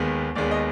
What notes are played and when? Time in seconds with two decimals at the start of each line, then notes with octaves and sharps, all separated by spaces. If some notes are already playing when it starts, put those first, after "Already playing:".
Already playing: D#2 D#3 G#3 B3
0.35 D#2 D#3 G#3 B3 D5
0.51 D#5